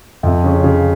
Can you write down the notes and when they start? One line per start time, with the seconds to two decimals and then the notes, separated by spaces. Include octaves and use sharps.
0.23 F2
0.44 C#3
0.64 C#3